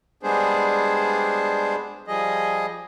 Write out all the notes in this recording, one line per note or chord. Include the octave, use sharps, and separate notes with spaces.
G3 G#3 B3 D4 G#4 C5
F3 G3 G#4 D#5